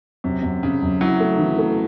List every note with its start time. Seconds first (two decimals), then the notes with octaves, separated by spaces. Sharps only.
0.24 F#2 C3
0.43 F#2
0.63 F#2 C#3
0.83 F#2
1.01 F#3 E4
1.20 A3
1.39 E3
1.58 A3